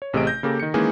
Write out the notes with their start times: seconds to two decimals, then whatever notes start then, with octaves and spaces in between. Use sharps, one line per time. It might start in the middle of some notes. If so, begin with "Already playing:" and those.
0.02 C#5
0.13 A1 C3 A3 G#4 D#5 D7
0.27 G6 A#6
0.43 C#3 A#3 G4 A4
0.60 D#3 C#7
0.74 D#3 E3 G#3 A#3 C#4 G#4